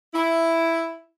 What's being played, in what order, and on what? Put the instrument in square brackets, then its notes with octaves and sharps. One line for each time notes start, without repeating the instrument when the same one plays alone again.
[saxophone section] E4